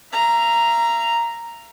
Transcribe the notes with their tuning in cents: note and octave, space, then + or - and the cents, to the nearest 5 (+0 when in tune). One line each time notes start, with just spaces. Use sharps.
E5 +45 A#5 +0